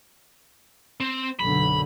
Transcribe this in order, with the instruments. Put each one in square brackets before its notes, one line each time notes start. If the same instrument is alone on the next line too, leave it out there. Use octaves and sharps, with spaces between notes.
[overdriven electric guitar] C4
[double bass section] B1 F#2 D3 [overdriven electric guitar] B5